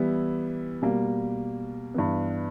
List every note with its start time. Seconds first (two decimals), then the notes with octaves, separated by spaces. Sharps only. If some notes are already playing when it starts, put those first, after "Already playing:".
Already playing: E3 G3 B3 E4
0.82 B2 G3 A#3
1.94 G2 E3 B3